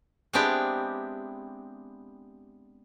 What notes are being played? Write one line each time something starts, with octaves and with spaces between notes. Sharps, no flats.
G#3 B3 C4 D4 E4 G4